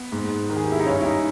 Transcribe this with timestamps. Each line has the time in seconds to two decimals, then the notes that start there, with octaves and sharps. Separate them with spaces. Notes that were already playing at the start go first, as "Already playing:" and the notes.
Already playing: B3
0.12 G#2
0.50 D#3
0.56 G#4
0.64 G4
0.72 E4
0.79 D#4
0.86 G2 C#4
1.01 E4
1.05 D#4